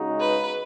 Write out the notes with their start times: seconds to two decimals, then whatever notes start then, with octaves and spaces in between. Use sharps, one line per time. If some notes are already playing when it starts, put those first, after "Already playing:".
Already playing: C#3 G#3 D#4 F#4
0.20 B4